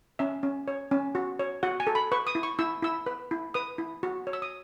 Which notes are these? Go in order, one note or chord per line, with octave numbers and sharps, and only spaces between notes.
C#4 E5
C#4
C#5
C#4
F#4
C#5
F#4 F#5
G#5
A4
B5
B4 C#6
D#6
E4
C#6
E4 E6
E4 E6
B4
E4
B4 D#6
E4
F#4
C#5
E6
D#6